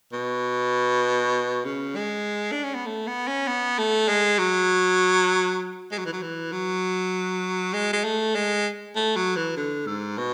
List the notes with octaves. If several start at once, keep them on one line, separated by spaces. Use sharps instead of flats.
B2
C#3
G#3
D4
C#4
B3
A3
B3
C#4
B3
A3
G#3
F#3
G#3
F#3
E3
F#3
E3
F#3
G#3
G#3
A3
G#3
A3
F#3
E3
D3
G#2
B2